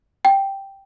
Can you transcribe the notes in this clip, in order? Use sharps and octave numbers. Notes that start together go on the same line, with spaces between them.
G5